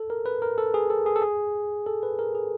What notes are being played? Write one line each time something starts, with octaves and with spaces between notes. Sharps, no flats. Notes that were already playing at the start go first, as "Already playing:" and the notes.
Already playing: A4
A#4
B4
A#4
A4
G#4
A4
G#4
A4
G#4
A4
B4
A#4
G#4